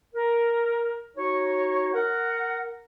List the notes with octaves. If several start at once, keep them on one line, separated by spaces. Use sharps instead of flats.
A#4
D#4 F#4 C#5
A#4 F#5